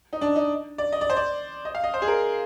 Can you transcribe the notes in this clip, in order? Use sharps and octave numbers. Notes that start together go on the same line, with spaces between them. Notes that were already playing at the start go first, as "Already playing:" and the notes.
D#4
D4
D#4
D5
D#5
D5
C5
D5
D#5
F5
D#5
C5
G#4
A#4